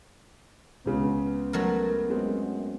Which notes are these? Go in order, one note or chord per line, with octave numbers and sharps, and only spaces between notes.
C#2 C#3 B3
F#3 A3 A#4
F#2 G#3 B3 C4